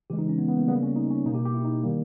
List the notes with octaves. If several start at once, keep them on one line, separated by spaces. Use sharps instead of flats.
C#3 E3 G#3 G4
D#4
C#4
B3
B3
A#3
C#3 G3 A#3 B3
C#4
D#4
C#4
B2 A#3 D#4
G4
G4
E4
D#4
D#3 G3 A#3